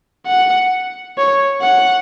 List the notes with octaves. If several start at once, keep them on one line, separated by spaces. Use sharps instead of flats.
F#5
C#5
F#5